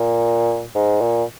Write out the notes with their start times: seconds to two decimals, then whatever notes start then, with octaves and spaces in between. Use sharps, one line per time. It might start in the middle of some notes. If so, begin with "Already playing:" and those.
Already playing: A#2
0.75 G#2
1.01 A#2